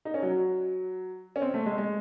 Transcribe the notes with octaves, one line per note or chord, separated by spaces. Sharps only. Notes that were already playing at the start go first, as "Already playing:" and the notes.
D#4
C#4
F#3
C#4
C4
A3
G#3
G#3